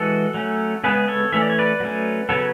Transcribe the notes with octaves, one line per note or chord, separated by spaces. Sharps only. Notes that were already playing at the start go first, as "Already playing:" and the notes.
Already playing: E3 G#3 F#4 A4
F#3 A3 C#4
C#3 G#3 B3 G#4 B4
A4 C#5
E3 A3 C#4 E5
D5
C#5
B4 D5
F#3 A3 C#4
C#3 F#3 B3 A4 C#5